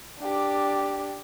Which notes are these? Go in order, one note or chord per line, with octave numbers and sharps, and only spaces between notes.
D4 G4